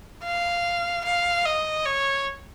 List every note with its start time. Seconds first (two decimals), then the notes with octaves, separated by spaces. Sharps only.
0.24 F5
1.05 F5
1.45 D#5
1.85 C#5